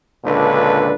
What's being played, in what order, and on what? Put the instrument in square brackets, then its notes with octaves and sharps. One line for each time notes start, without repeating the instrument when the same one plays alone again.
[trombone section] C#2 A#2 D3 D4 A4 B4